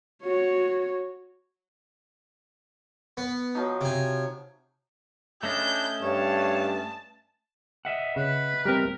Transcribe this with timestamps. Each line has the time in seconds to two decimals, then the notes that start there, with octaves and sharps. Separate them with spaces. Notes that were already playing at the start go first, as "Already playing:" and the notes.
0.24 F#4 C#5
3.17 B3
3.55 F3 F#3 D#4
3.81 C3 G#5
5.43 A3 C#4 D4 D#5 G6
6.02 G2 C#5 A5
7.85 D#5 E5 F#5
8.16 C#3 B4
8.65 G3 C4 A#4